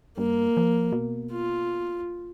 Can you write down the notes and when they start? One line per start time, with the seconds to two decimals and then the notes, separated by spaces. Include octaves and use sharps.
0.18 G2 A#3
0.57 F3
0.92 B2
1.31 F4